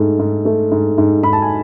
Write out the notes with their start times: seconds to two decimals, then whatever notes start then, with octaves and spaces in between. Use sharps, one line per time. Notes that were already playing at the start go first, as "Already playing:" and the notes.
Already playing: G#2 A3
0.19 G#2
0.45 A3
0.72 G#2
0.98 G#2
1.23 G#2 B5
1.33 A5
1.42 G#5